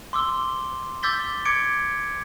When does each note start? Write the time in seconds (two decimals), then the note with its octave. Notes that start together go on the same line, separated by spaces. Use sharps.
0.13 C6 D6 E6 G7
1.03 D6 E6 G6 A6 B6 G7
1.45 D6 G#6 C#7 D7